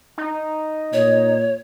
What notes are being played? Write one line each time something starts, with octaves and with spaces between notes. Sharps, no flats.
D#4
A#2 C#5